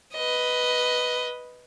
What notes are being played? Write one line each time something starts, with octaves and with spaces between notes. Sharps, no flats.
B4 D#5